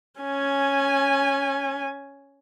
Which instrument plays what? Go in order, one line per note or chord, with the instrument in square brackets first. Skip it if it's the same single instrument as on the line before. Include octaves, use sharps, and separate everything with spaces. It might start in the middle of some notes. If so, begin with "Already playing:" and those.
[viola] C#4 G#5